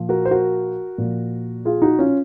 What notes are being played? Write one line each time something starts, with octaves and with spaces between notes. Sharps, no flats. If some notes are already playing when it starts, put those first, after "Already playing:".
Already playing: A#2 F3
F#4 A#4
C5
F#4 A#4
A#2 F3
F4 G#4
D#4 F#4
C#4 F4